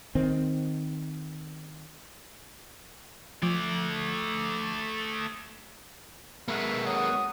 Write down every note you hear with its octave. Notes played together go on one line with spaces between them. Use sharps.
D#3 C4
F3 A3 D5
G#3 A#3 B3 F#4 E5
F#3 D#6